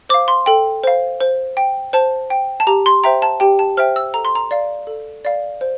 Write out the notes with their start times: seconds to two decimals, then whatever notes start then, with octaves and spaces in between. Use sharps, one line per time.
0.09 C5 F5 D6
0.28 C6
0.46 A4 G5
0.84 C5 F5
1.20 C5
1.57 G5
1.93 C5 A5
2.30 G5
2.60 A5
2.67 G4 A#5
2.86 C6
3.04 C5 E5 G5 A#5
3.22 A5
3.40 G4 G5
3.59 A5
3.77 C5 E5 G5 F6
3.96 E6
4.14 A4 A#5
4.25 C6
4.35 A#5
4.51 D5 F5
4.87 A4
5.25 D5 F5
5.61 C5